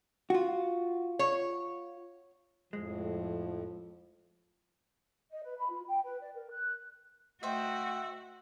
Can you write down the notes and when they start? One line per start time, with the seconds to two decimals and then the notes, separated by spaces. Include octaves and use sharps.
0.30 F4 F#4
1.19 C#5
2.73 F2 A2 F3 G#3
5.31 D#5
5.44 B4
5.58 B5
5.70 F4
5.88 G5
6.05 B4
6.20 D5
6.35 A#4
6.51 F#6
7.43 A3 F#4 C5 D#5 E5 G5